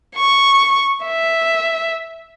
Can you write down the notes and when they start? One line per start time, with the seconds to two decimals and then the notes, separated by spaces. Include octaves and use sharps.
0.16 C#6
1.05 E5